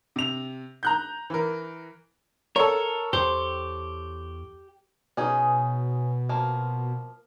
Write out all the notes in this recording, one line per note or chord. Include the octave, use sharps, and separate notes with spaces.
C3 F7
A#5 F#6 G6
E3 A#4
A4 A#4 C#5
E2 G4 C5
B2 C#4 D#4 G#4
F3 A#3